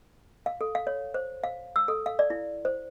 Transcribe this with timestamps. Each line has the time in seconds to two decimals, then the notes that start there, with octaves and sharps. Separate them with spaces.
0.46 F5
0.61 A4
0.75 F5
0.87 C#5
1.14 C5
1.44 F5
1.76 E6
1.88 A4
2.06 F5
2.19 D5
2.30 E4
2.65 C5